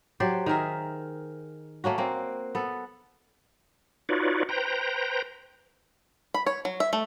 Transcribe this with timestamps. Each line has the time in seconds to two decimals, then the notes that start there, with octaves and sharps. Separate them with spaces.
0.20 F#3 G4 C5 D5
0.46 D#3 G#4 A#4 E5
1.84 A3 A#3 C#4 F#4
1.98 A#3 C4
2.55 B3 A4
4.09 D#4 F4 F#4 B4 C#5 D5
4.49 B4 C5 G5 A#5
6.34 B5
6.46 C#5
6.65 F#3
6.80 E5
6.93 A3